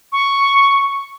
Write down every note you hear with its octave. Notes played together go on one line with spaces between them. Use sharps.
C#6